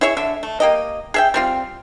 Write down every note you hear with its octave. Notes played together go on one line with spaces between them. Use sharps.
E4 G#4 C#5 E5
D3 E5
A3
A#3 G4 D#5
G#4 E5 G5
G3 C4 F4